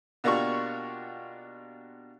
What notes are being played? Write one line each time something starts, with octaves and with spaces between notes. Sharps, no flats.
B2 A#3 D4 F4 G4 C#6